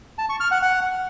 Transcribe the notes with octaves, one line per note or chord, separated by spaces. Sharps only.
A5
C#6
F6
F#5
F#5